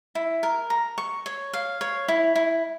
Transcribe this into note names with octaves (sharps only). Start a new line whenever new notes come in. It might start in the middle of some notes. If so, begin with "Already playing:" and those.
E4
A#4
A#5
C#6
C#5
F5
C#5
E4
E4